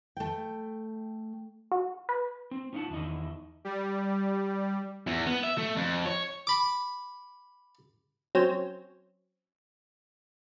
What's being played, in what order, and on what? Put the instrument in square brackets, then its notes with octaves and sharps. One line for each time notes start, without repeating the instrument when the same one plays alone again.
[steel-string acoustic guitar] A3 G5
[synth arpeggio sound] F#4
B4
[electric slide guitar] C4
C#4 D#4 F4 B4 F#5 A5
E2 D#3 E4 D#5
[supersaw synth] G3
[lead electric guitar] E2
B3
E5
A3
F2
C#5
[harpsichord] B5 D6
[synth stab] F#3 C4 C#4 C5